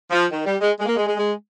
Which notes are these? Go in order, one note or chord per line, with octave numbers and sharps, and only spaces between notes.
F3
D#3
G3
G#3
G#3
A#3
G#3
G#3
G#3